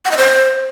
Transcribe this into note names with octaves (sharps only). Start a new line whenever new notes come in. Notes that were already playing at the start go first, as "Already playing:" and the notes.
F#5
D#5
C5